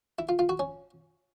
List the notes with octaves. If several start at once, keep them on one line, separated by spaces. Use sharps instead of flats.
E4
F4
F4
F#4
C#4